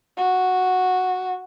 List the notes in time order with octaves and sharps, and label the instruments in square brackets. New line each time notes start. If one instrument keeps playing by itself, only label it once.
[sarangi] F#4